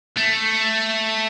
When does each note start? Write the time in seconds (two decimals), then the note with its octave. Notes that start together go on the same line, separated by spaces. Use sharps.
0.17 A3